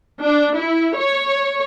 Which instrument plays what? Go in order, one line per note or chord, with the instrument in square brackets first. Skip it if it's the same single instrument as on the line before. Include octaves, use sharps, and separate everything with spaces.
[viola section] D4
E4
C#5